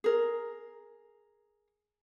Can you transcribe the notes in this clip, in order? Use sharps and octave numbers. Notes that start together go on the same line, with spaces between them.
G#4 A#4